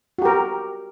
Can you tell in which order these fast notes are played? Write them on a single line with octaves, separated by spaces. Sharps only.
F#4 G4 A#4